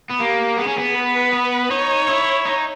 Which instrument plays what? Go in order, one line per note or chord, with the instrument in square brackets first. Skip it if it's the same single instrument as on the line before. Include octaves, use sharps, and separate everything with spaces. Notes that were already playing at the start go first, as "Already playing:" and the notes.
[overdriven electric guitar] B3
[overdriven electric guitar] A#3 [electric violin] G4
[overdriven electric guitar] B3 [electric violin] G#4
[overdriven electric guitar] C#4
B3
[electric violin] B4
[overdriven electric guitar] B3
[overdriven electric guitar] D#4 [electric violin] C#5
[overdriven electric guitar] E4
D#4